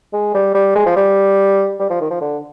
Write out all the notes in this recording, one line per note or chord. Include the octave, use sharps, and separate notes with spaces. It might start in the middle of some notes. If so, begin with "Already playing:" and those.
G#3
G3
G3
G#3
F3
G3
G3
F3
D#3
F3
D3